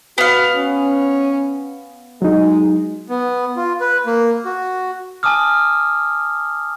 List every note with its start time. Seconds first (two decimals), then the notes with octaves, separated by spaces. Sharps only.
0.18 B3 F#4 F5
0.56 C#4
2.22 F#3 G#3 D#4
3.09 B3
3.56 F4
3.80 B4
4.06 A#3
4.45 F#4
5.23 G#5 A5 D6 D#6 F6